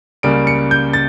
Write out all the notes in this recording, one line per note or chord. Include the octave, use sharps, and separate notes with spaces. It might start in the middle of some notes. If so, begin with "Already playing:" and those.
C#2 C#3 G3 A#3 D7
C#7
G6
A6